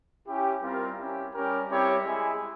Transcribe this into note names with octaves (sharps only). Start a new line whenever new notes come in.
C#4 E4 G4
G3 C4 F4 A#4
C#4 E4 G4
G3 C#4 G4 A#4
G3 C4 E4 G4 C#5
G#3 E4 G#4